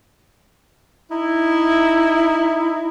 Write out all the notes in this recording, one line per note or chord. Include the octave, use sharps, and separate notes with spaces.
D#4 E4